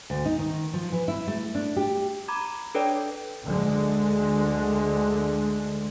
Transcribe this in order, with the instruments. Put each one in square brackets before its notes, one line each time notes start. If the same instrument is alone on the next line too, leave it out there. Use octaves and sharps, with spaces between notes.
[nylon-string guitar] D2
D#4
D#3
F3
E3
E4
A3
D4
G4
[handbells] A#5 B5 D6 G#6
D4 A4 B4 C#5 D5 G5
[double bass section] D2 D3 G#3